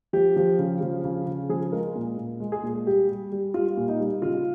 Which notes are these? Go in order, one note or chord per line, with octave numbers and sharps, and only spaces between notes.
F3 G4
F3
C#3
F3
C#3
C#3
F3 G#4
G#3 A#4
A#2
A#2
G#3
G#4
A#2
G3 G4
G3
G3
G3 F4
A#2
D#4
G3
C#3 F4